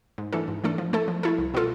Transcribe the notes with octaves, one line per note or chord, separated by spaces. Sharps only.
G#2
E3 A3 D4 A4
G#2
E3 A3 D4 A4
F3
A3 E4 A4
F3
A3 E4 A4
C2
B2 B3 F4 A4